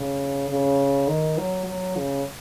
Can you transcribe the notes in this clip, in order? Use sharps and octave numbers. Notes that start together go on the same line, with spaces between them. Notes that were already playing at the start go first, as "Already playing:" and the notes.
Already playing: C#3
C#3
D#3
F#3
F#3
C#3